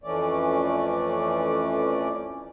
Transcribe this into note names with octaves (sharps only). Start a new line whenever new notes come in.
F2 E3 A3 C#4 D5